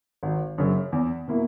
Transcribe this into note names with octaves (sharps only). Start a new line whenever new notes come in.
G#1
F#2 C#3 F#3
E2
B2 A#3 E4